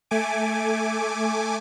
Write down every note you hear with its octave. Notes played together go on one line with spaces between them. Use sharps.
A3 G#5 D6